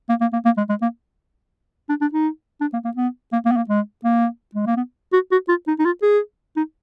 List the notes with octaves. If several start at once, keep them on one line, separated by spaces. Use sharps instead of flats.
A#3
A#3
A#3
A#3
G#3
G#3
A#3
D4
D4
D#4
D4
A#3
A#3
B3
A#3
A#3
B3
A#3
G#3
A#3
G#3
A#3
B3
F#4
F#4
F4
D#4
D#4
F4
G#4
D#4